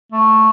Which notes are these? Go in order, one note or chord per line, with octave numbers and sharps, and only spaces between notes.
A3